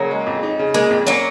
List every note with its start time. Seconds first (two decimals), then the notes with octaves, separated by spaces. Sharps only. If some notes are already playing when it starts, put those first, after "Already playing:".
Already playing: C#3 F#3 A#3
0.11 G#3
0.26 F2
0.43 D#4
0.59 C#3
0.74 G#3 A#3
0.90 F2
1.07 F#3 A#3 C#4